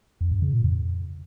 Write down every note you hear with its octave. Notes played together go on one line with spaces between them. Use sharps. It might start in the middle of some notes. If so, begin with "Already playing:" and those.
F2
G2
C#3
A#2
F2